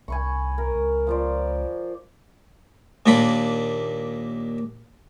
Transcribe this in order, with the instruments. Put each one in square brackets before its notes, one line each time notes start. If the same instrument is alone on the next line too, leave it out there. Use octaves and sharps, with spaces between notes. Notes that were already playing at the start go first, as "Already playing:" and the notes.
[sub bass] C2 [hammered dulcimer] G#5 B5 C#6
[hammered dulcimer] A#4
[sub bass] C#2
[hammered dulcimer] F3 C5 D5
[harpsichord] D#2 A#2 D4 F4 B5 D6